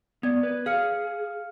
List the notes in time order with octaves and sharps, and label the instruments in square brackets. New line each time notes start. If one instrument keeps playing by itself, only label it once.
[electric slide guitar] B3 [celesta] D5 G#6
[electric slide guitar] B4
[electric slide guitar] G#4 [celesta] F5 F6 C#7